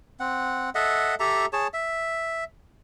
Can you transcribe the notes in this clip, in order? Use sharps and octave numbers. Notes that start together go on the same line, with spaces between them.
C4 F#5
A4 D#5 E5 F#5
G4 A4 E5 A#5
G#4 C#5 A5
E5